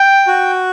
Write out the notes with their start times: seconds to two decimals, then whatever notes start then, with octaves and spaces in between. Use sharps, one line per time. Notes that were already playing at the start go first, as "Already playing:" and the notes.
Already playing: G5
0.27 F#4